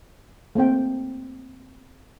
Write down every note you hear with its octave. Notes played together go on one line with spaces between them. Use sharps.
A3 A#3 C4 G5